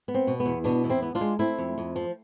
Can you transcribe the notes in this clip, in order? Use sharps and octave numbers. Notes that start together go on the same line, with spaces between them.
B3
C4
B2
B3
E2
B2 B3 D4
E2
C4 E4
B3
D4 F4
G#3
A3 C4 E4
F2
F2
F3